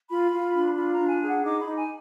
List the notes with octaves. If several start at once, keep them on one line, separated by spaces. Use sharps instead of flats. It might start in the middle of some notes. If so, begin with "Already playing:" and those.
F4 B5
F4
D4
F4 B5
D4 A#5
G#5
G#4
F#5
D#4 D6
B5
D#4
G#5